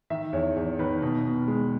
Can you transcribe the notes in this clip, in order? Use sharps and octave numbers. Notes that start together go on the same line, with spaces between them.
D#3 E5
E2 C#5
E2 C#5
D#3 B4
B2
B2
G#3